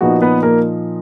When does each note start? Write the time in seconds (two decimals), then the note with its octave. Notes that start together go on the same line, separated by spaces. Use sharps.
0.01 A#2 F3 B3 D#4 F#4
0.22 B3 B4
0.43 A#3 A#4